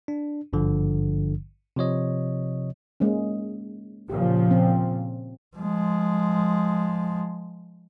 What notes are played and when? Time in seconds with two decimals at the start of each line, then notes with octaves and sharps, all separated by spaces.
0.08 D4
0.53 G#1 G2 D3 F3
1.76 C3 F3 C#5 D#5
3.00 G#3 A#3 C#4
4.10 A#2 C#3 F3 G4
4.51 C4
5.58 F3 G#3